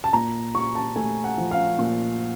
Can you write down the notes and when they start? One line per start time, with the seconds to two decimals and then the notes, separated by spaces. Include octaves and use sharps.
0.04 A5
0.13 A#2 A#5
0.55 A#2 C#6
0.75 A5
0.96 A3 G#5
1.24 F#5
1.38 F3
1.51 F5
1.79 A#2